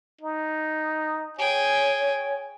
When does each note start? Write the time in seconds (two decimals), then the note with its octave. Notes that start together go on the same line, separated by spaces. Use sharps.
0.21 D#4
1.38 G#4 C#5 G5 G#5